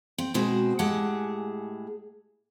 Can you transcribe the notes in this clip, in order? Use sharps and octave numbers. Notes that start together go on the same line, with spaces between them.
C4
B2 G#3 C4 F#4 C5
A2 G#3 G4 G#4 F#5 A5